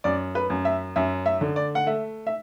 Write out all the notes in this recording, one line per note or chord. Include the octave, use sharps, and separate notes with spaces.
F#2 D5
B4
F#2
E5
F#2 E5
E5
D3
D5
F#5
A3 E5
E5